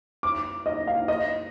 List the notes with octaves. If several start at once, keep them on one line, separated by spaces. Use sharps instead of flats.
D6
D#5
F5
D#5